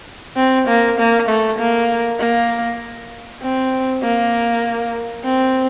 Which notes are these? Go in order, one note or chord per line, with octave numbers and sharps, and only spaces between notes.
C4
A#3
A#3
A3
A#3
A#3
C4
A#3
C4